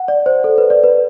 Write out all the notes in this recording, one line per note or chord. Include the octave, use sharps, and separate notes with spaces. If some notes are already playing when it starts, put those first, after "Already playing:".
Already playing: F#5
D5
C5
A4
B4
D5
B4